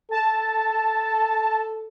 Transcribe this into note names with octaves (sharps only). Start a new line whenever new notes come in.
A4 A5